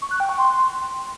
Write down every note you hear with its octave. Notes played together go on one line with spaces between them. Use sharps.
C#6
F#6
G5
C#6
C6